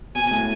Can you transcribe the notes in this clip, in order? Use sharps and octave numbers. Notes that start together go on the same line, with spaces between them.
B2 G#5
A2